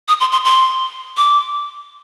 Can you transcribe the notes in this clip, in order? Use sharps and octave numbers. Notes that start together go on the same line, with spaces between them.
D#6
C6
C6
C6
D6